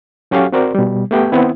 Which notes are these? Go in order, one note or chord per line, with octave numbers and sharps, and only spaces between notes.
F#3 C#4 F#4 G4 A4 F5
C4 F#4 A#4 C5 D5
B2 G3
A3 B3 G4 B4 G5
D#3 B3 C4 E4